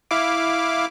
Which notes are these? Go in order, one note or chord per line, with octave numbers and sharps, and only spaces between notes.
E4 F5 D6